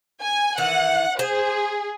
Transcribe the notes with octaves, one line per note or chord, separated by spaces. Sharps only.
G#5
D#3 E3 F#5
G#4 C5